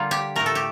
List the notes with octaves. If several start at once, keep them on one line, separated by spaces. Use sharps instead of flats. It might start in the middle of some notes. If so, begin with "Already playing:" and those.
Already playing: D3 G3 A#3 F4
G4
A2 A3 A#4
A4
G4